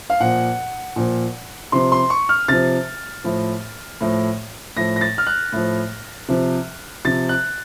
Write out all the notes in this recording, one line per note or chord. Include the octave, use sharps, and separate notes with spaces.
F5
A#2 F3 F#5
A#2 F3
C3 F3 C6
C6
C#6
F6
C3 F3 A6
A2 F3
A2 F3
A2 F3 A#6
A#6
A6
F6
F#6
A2 F3
C3 F3
C3 F3 A6
F#6